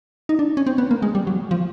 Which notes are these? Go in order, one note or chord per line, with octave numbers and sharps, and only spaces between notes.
D#4
D4
C#4
C4
B3
A#3
G#3
G3
F#3
F3